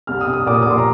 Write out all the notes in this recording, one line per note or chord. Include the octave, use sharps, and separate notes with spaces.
C2 F6
D#6
C2
D#6
A#2 D6
D#6
D6
A#2 C6
A#5